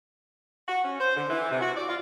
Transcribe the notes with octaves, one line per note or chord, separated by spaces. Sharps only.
F#4
C#4
C5
D3
E3
C3
F#4
D5
F4